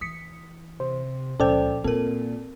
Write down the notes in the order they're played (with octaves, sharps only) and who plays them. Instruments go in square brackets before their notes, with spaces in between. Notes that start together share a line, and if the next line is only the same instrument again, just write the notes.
[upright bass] E3 [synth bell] D#6 B6 C#7
[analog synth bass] C3 [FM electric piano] C5
[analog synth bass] C#2 [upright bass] A#2 F3 [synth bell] C#4 C5 [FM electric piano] A4 D5 G5
[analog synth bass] A#2 [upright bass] A#3 [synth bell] C4 A#4 [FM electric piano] A4